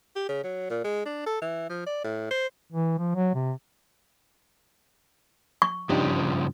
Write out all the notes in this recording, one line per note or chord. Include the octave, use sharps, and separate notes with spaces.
G4
C#3
F#3
A#2
G#3
D4
A4
E3
F3
D5
A2
C5
E3
F3
F#3
C3
C#6
G2 C#3 F3 D4 D#4 G4